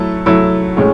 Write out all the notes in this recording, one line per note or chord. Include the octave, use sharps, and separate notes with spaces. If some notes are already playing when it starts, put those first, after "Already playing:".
Already playing: F#3 A3 E4 A4
F#3 A3 E4 A4
A2 G#3 C#4